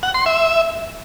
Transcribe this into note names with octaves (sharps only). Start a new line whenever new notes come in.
F#5
C6
E5